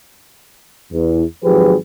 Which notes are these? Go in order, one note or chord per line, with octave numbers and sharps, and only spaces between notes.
E2
G#1 F3 F#3 G4 G#4 B4